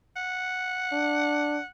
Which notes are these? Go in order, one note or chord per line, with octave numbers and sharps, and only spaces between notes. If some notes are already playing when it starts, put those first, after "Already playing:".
F#5
D4